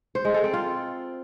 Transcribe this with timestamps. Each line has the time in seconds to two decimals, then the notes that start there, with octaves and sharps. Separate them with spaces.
0.15 C5
0.25 G#3
0.34 A4
0.44 C4
0.53 F4